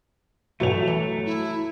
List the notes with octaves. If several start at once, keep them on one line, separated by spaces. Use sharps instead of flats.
G2 B2 E3 F#3 A3 F7
E3
E4